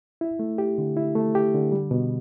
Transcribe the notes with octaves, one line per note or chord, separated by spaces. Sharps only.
E4
A3
G4
D3
E4
A3
G4
D3
G3
B2